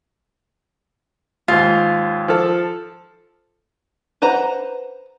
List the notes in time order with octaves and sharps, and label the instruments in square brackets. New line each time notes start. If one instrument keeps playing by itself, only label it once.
[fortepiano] D#2 G#2 [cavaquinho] F4
[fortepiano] F3 A4
[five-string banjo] B4 C5 F#5 A#5